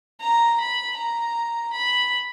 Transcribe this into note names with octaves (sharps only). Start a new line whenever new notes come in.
A#5
B5
A#5
B5